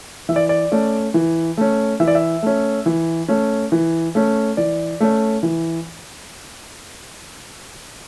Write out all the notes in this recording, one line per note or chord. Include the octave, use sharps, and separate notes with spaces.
E3 E5
D5
D5
A3 C#4
E3
A3 C#4
E3 E5
D5
E5
A3 C#4
E3
A3 C#4
E3
A3 C#4
E3 D5
A3 C#4
E3